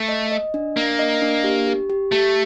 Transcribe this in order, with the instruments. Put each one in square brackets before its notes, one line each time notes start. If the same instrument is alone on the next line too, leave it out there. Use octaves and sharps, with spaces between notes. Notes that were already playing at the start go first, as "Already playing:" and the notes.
Already playing: [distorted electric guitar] A3
[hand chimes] D#5
D#5
D4
[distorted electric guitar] A#3 [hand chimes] D4
[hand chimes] D#5
D4
G4
G4
G4
[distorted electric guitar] A3 [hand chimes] G4